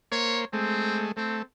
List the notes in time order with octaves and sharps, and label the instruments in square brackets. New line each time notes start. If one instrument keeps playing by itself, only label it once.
[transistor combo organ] A#3 C5 [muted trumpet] C#5
[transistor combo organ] G#3 A3 [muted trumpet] C4
[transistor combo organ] A3 [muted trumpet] C4